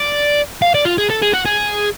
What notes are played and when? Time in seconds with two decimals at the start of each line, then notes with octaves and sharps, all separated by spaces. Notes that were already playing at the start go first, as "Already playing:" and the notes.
Already playing: D5
0.62 F5
0.75 D5
0.85 F4
0.98 G#4
1.10 A4
1.22 G#4
1.34 F#4
1.46 G#4